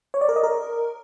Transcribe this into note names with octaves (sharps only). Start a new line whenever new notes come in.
C#5
D5
A#4
D#5
A#4